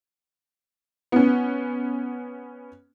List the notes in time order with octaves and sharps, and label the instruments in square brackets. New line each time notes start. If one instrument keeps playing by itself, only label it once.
[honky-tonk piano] B3 C#4